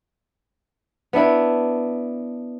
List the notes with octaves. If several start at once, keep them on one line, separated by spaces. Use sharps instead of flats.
B3 D4 E4